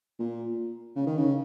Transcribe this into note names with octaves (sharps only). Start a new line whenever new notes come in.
A#2
C#3
D#3
C#3